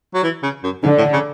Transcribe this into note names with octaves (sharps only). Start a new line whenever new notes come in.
F#3
E3
C#3
F#2
G#2 D3
A2
C#3